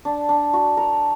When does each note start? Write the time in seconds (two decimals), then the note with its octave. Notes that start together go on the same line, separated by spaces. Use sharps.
0.05 D4
0.29 D4
0.53 F#4
0.77 A#4